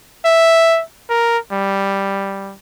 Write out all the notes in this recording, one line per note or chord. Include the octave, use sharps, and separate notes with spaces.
E5
A#4
G3